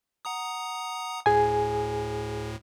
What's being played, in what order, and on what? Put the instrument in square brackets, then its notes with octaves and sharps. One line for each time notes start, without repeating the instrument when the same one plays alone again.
[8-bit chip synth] F#5 A#5 D#6
[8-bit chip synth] D2 A2 [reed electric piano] G#4 G#5